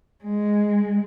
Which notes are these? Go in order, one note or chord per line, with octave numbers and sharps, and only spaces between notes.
G#3